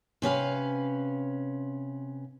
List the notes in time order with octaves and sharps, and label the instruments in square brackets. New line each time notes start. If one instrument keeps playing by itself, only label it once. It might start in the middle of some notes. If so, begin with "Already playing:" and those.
[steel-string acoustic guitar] C3 C#4 B4 F5